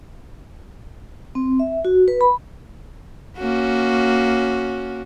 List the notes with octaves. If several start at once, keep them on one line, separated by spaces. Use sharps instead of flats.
C4
E5
F#4
B4
B5
A#3 C#4 F#4